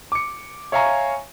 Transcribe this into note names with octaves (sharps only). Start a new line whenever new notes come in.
D6 C#7
C#5 E5 F5 G#5 A#5 C#6